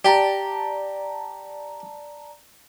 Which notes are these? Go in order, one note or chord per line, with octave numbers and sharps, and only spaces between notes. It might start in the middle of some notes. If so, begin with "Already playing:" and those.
G4 D5 A5 A#5